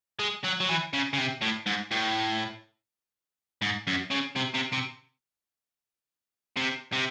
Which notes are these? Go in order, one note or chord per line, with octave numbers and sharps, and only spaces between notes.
G#3
F#3
F#3
E3
C#3
C#3
C3
A2
G#2
A2
G#2
F#2
C#3
C3
C3
C3
C3
C3